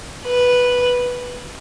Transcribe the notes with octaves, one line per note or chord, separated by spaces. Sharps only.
B4